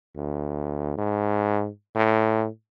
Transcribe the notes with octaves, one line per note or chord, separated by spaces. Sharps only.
D2
G#2
A2